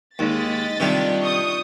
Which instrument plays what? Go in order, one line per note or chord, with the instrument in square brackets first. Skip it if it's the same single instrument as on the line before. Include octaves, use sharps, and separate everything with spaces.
[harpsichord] D#2 [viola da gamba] G#3 [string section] D#5 A6 B6
[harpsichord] C3 D#3 G3 [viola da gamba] D4 F4
[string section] C#6 D#6 G6